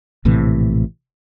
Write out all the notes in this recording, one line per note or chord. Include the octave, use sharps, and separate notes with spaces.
A#1 A2 C3 E3